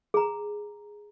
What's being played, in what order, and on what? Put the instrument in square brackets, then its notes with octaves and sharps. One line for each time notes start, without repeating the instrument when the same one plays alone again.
[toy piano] G#4 A#5